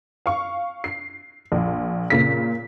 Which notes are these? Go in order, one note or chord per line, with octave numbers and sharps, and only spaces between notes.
F5 C#6
C7
A#1
A#2 C#3 B6